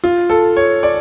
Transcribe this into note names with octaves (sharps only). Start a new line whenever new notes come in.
F4
A4
C#5
D5